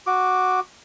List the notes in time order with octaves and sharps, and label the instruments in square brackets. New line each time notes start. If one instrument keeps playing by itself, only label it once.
[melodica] F#4 D6